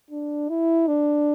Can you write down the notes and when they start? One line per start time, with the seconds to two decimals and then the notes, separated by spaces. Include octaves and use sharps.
0.11 D4
0.49 E4
0.87 D4